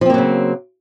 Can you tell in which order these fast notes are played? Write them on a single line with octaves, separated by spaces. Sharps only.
F3 C4 A#3 F#3 C#3